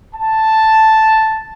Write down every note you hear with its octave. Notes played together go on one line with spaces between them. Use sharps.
A5